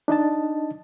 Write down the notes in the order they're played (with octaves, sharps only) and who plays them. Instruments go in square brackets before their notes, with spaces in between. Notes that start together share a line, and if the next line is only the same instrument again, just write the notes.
[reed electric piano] D4 D#4 D#5 A5